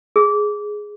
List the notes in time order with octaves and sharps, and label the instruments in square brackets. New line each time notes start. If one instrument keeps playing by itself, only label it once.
[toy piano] G#4